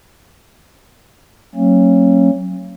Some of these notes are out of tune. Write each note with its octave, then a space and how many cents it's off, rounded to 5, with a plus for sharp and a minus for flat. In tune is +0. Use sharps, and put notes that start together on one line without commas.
F#3 +0 A#3 -40 C#4 -35